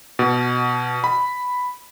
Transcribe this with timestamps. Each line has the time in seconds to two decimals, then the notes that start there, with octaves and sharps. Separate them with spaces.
0.19 B2
1.04 B5